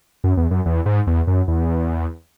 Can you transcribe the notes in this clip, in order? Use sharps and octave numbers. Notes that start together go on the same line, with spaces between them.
F#2
E2
F#2
E2
G#2
E2
F#2
E2